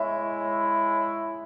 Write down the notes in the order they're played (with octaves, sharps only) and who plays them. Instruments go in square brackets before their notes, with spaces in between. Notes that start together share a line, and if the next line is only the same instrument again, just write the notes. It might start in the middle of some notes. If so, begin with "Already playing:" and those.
Already playing: [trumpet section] G#3 E4 C#5 [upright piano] E5